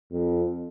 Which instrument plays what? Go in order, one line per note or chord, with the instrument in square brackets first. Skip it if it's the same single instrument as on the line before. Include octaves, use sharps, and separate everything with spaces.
[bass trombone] F2